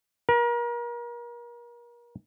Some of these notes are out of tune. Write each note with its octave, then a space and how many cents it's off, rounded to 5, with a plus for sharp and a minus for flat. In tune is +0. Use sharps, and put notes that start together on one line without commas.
A#4 +35